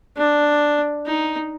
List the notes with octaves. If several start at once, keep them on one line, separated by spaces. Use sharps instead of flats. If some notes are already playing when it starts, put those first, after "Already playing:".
D4
D#4